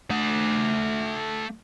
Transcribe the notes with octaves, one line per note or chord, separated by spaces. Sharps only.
A3 F#5